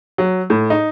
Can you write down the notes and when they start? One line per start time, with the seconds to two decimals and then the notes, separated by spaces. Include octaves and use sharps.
0.18 F#3
0.50 A2
0.70 D#4